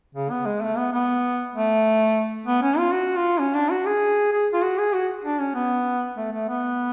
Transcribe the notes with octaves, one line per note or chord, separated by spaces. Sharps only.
C#3
B3
G#3
A3
B3
B3
A3
B3
C#4
F4
F#4
F4
C#4
D4
F#4
G#4
G#4
F4
F#4
G#4
F#4
D4
C#4
B3
A3
A3
B3